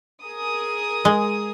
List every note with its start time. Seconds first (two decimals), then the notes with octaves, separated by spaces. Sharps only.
0.23 G#4 A#4 D#6
1.05 G#3